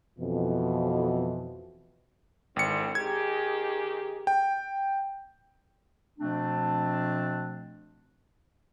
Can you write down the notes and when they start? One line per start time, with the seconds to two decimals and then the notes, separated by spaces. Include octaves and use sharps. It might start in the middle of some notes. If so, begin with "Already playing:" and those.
0.19 F2 B2 E3
2.56 G#1 D3 E3 C4 C#7
2.95 D#3 G4 G#4 G#6
4.27 G5
6.19 B2 F3 A3 C4 D4